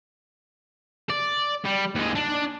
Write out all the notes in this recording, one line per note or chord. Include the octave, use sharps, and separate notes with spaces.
D5
G3
D#2 G#3
D4